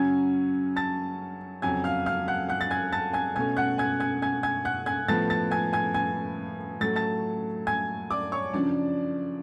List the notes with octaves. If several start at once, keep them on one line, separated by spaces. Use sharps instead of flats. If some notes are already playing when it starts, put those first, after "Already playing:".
Already playing: F#2 C#3 F#3 C#4 G#5 G#6
A5 A6
F2 C#3 F#3 G#5 G#6
F5 F6
F5 F6
F#5 F#6
F#5 F#6
A6
G#5 G#6
A5 A6
G#5 G#6
B2 A3 C#4 G#5 G#6
F#5 F#6
G#5 G#6
G#5 G#6
G#5 G#6
G#5 G#6
F#5 F#6
G#5 G#6
A2 F3 B3 A5 A6
A5 A6
G#5 G#6
G#5 G#6
G#5 G#6
A2 F#3 A3 A6
A5 A6
G#5 G#6
D5 D6
C#5 C#6
F#2 C#3 F3 D4 D5